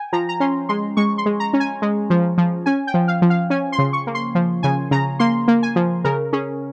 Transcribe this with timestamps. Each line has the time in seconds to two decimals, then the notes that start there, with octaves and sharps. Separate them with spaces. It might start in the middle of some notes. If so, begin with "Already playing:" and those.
Already playing: G5 G#5
0.13 F3 A#5
0.29 A#5
0.40 C#4 C6
0.69 G#3 C6
0.97 G#3 C#6
1.18 C6
1.26 G#3
1.40 A#5
1.53 C#4
1.60 G#5
1.82 G#3
2.10 F3
2.38 F3
2.66 C#4 G#5
2.87 G5
2.94 F3
3.08 F5
3.22 F3
3.30 F5
3.50 C#4 G#5
3.72 C6
3.78 C#3
3.93 C#6
4.07 A#3
4.15 C6
4.35 F3
4.63 C#3 G#5
4.91 C#3 A#5
5.19 A#3 C6
5.48 A#3
5.63 G#5
5.76 F3
6.04 C#3 A#4
6.33 C#4 G#4